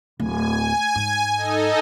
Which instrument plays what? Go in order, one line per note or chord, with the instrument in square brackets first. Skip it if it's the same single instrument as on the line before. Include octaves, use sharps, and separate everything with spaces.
[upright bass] D1 [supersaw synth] G#5
[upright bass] G#2
[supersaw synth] D#4 A4 D#5